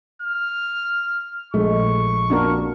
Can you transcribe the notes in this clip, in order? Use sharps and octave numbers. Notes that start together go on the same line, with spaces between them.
F6
A#1 G#3 A3 C#6
F2 A#2 A#3 D4 F#4 A#4